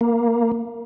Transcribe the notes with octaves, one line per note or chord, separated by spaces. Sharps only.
A#3